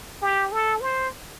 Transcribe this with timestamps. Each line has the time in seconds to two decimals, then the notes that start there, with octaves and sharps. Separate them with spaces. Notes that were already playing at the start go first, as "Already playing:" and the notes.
0.22 G4
0.53 A4
0.81 C5